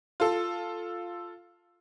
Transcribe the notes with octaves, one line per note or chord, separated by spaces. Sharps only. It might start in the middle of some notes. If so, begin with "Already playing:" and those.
F4 A4